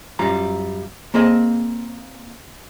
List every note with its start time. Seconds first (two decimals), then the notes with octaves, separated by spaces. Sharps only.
0.19 F#2 G3 F4 A#5
1.14 A#3 C4 G#4 D#5